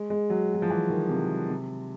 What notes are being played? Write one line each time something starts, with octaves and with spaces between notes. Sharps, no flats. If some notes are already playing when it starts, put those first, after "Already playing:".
Already playing: G#3
G#3
F#3
F#3
F3
E3
D#3
C3
C3